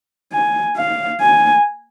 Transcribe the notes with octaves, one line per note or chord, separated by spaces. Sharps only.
G#5
F5
G#5